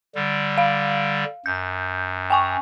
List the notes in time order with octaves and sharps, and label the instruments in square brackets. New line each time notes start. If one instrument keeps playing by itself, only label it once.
[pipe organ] D3 G3
[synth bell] F5
[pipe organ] F#2 [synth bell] G6
[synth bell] G5 G#5 C#6